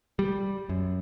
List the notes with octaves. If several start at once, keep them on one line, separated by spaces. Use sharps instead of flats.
G3
F#2